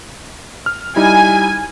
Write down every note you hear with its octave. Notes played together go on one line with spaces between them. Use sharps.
F6
G3 D#4 E4 G#5